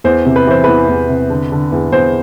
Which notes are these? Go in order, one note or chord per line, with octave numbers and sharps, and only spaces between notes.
E2 C5
C3
B4
E3 C5
E2 B4
E2
C3
D3
D3
E2
E2 C5